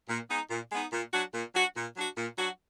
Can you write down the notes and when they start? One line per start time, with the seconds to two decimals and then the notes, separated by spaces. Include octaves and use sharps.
0.09 A#2
0.29 G#3 B3 D#4
0.50 A#2
0.72 G#3 B3 D#4
0.92 A#2
1.13 F#3 D4 F#4
1.34 A#2
1.55 F#3 D4 F#4
1.76 A#2
1.96 F#3 D4 F#4
2.17 A#2
2.38 F#3 D4 F#4